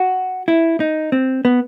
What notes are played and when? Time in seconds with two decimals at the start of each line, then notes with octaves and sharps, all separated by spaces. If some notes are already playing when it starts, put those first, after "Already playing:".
Already playing: F#4
0.48 E4
0.80 D#4
1.12 C4
1.45 B3